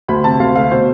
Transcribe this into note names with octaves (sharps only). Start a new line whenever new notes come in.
D2 B5
C3 A5
D2 F5
A3 F5
B2 C5